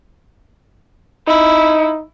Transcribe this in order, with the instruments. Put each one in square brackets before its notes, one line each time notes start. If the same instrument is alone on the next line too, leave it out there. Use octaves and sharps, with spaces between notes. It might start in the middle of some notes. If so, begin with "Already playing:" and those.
[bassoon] D#4 [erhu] E4